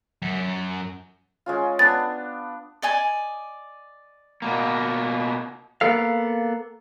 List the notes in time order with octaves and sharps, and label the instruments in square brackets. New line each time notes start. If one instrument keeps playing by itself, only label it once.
[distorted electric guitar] F#2
[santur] G#3 C#4 F4
[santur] B3 D4 [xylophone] A6
[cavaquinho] D5 D#5 G#5
[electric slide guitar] B2 A#3
[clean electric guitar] A#3 B3 A4 F5